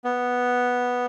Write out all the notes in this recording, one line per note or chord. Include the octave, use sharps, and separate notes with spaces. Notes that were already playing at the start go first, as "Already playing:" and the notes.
B3